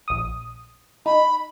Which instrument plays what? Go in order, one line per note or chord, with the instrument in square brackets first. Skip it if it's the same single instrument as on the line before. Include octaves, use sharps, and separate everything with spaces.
[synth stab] A#1 D#6
[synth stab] D#4 [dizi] B5